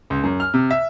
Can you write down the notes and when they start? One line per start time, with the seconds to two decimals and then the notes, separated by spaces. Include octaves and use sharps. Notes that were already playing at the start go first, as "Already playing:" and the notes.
0.10 C#2
0.23 F#2
0.40 F6
0.54 C3
0.71 E5